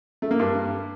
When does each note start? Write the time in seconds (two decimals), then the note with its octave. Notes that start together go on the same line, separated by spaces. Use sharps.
0.22 A3
0.31 A#3
0.39 G2